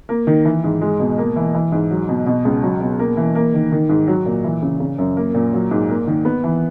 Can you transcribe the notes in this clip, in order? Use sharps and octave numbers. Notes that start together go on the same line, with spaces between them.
A#3
D#3
E3
G#2
G#3
B2
A#3
E3
E3
G#2
F#3
B2
B2
C#2
F#3
B2
A#3
E3
A#3
D#3
D#3
G#2
F#3
A#2
E3
C#3
C#3
F#2
A#3
A#2
F#3
G#2
A#3
D#3
B3
E3